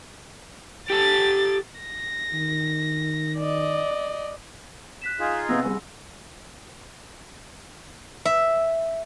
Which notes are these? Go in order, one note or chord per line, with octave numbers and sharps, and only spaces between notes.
G4 A4 A6
A#6
D#3
D5 D#5
F#6 B6 E7
D#4 F4 G#4
C3 B3 F#5 E6 A#6
C2 G#4
E5